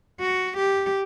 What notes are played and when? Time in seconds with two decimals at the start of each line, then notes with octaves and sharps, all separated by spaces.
0.20 F#4
0.57 G4